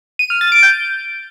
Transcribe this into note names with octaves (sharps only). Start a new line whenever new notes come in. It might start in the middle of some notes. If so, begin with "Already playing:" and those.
D#7
F6
A6
D7
G6